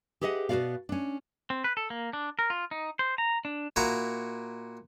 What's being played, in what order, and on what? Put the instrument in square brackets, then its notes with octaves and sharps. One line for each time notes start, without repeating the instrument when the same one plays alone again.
[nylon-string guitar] G4 G#4 B4 D#5 E5 F#5
B2 B3 F4 F#4 D5 F5
C#4 D4
[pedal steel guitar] C4
B4
A4
A#3
D4
A#4
F4
D#4
C5
A#5
D4
[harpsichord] A#2 E4 F#4 A#5